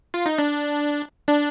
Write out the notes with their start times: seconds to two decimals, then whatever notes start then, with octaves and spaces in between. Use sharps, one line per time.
0.14 F4
0.26 D#4
0.38 D4
1.28 D4